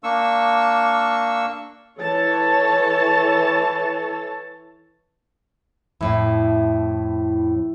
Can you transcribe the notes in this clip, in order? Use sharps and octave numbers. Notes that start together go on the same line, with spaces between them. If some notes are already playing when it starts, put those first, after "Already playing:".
A#3 D4 C#6 E6
E3 A4 C#5 A5
F2 A2 E4